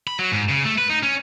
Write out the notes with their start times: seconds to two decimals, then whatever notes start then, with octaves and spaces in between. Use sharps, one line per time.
0.07 B5
0.19 F#3
0.32 G#2
0.49 C#3
0.65 A3
0.78 B4
0.89 D#4
1.03 C#4